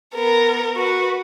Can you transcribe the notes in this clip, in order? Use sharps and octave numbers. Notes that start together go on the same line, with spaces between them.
B3 A#4
F#4 B4